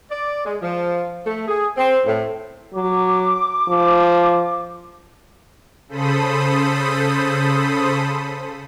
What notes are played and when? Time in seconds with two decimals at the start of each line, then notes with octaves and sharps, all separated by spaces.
0.10 D5
0.45 G#3
0.61 F3
1.26 A3
1.48 G#4
1.77 C4
2.06 A2
2.74 F#3 D6
3.68 F3
5.89 C#3 A4 C5 B5 D#6